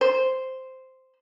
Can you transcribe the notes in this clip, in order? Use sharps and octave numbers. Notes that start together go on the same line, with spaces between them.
C5